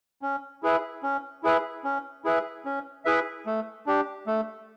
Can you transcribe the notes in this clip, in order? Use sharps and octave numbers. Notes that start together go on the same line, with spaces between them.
C#4
E4 G#4 B4 E5
C#4
E4 G#4 B4 E5
C#4
E4 G#4 B4 E5
C#4
E4 G#4 B4 E5
A3
D4 G4
A3